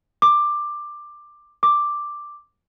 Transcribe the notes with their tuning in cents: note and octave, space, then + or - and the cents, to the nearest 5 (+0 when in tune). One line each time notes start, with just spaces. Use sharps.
D6 +15
D6 +5